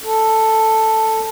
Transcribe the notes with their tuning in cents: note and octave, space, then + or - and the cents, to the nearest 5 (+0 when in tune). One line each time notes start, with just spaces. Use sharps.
A4 +5